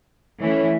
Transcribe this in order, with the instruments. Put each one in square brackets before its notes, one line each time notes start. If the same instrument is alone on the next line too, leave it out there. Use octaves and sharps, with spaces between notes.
[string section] E3 A3 C#4 E4